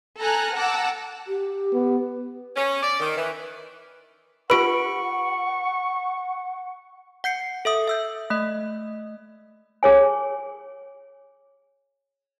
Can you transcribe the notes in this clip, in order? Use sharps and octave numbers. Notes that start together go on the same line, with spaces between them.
A4 G#5 A#5 F6 F#6
F#5 G5 A5 A#5 D6 E6
G4
B3
C#4
D5
D#3
E3
F4 G4 B4 F#5 B5 C#6 D7
F#5 G6 C7 C#7
A4 E5 D#6
E5 E6 G6
A3 D#5
G#4 C#5 G#5